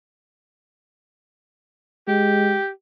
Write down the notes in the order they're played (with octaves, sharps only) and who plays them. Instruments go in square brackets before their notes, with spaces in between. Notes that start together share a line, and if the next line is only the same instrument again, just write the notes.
[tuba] G#3 [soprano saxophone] G4